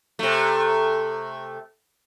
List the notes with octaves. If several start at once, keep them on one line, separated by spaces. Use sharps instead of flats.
C3 A3